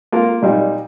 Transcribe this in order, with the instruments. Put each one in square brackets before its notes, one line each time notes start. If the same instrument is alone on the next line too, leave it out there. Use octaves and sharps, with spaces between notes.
[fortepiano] A#3 F4 A#4
A#2 G3 D#4